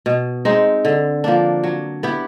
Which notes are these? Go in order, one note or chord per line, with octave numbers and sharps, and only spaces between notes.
B2
G#3 C4 D#4
D3
F3 A#3 D4
F#3
B3 E4 G4